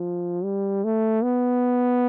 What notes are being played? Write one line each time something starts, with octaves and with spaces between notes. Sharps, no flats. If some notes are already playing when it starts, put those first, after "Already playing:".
Already playing: F3
G3
A3
B3